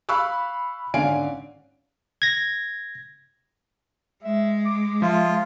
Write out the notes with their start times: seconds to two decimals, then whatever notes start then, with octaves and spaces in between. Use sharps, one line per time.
0.09 F5 B5 C#6 E6 F#6
0.94 G#1 D3 C#4 F5 G#5 D7
2.22 G#6 A#6
4.24 G#3 E5
4.66 D6
5.02 F3 F4 E5